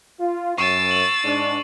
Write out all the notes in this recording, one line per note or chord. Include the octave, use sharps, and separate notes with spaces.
F4
F#2 C#6 E6 A6 C7 D7
F#7
G#2 D4